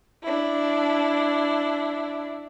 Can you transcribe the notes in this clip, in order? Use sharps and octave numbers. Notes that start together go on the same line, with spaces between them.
D4 E4